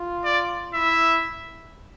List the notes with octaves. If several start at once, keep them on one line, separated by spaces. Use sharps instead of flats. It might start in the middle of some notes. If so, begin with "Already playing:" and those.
Already playing: F4
D5
E4 E5